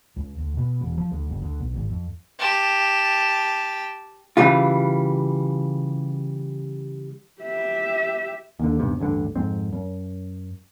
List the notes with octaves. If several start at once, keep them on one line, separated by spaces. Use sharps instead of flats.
C#2
D2
B2
E1
F3
D2
F#1
D2
B1
G#1
F2
G4 A5
C#3 E3 G3 F4
G4 E5
D#2 D3
D#1 B1 G2 C3
A1 D2 G2 D3
F2 G#2 C4
F#2